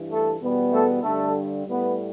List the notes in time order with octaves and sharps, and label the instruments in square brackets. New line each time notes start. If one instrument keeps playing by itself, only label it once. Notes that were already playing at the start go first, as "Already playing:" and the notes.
Already playing: [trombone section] G2 E3
A3 A4
E2 B2 G3 B3
A3 A4
G2 D3 G3 A3 A4
A2 G3 B3